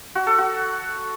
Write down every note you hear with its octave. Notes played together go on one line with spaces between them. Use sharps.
F#4
A4
F#4